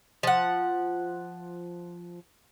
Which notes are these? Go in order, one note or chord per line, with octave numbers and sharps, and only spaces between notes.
F3 F#5